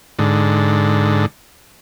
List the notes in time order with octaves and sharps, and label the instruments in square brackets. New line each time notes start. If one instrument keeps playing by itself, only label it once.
[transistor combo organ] G#2 D3